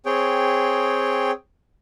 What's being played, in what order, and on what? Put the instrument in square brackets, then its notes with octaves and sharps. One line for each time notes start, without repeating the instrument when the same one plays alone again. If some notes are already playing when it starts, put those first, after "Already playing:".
[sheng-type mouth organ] C4 G#4 C#5 G5